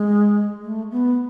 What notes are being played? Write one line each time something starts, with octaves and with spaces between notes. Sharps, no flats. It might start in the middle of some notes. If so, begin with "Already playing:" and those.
Already playing: G#3
A3
B3